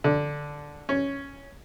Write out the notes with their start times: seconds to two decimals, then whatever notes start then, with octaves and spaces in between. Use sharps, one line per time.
0.04 D3
0.89 C#4